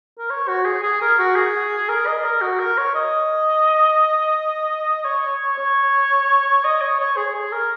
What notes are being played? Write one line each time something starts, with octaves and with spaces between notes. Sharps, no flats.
A#4
C#5
F#4
G#4
G#4
A#4
F#4
G#4
A#4
D#5
A#4
F#4
A#4
C#5
D#5
C#5
C#5
D#5
C#5
C#5
G#4
G#4
A#4